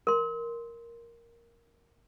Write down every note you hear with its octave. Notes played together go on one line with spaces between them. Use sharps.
A#4 C6